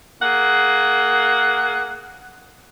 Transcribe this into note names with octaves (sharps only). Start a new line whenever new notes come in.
A#3 G#4 F#5